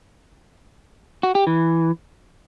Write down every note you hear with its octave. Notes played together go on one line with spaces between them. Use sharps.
F#4
G4
E3